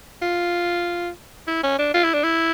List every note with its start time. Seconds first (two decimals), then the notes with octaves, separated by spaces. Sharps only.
0.22 F4
1.47 E4
1.63 C#4
1.78 D4
1.94 F4
2.04 E4
2.14 D4
2.24 E4